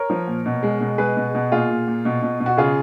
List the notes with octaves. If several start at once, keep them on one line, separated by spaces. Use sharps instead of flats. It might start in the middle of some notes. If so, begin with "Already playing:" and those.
Already playing: A#4 C#5
F3
A#2
B2
G#3
B2
G#3 G#4 B4
B2
B2
A#2 F4 G#4
A#2
A#2
B2
B2
B2
F#4
C#3 F4 G#4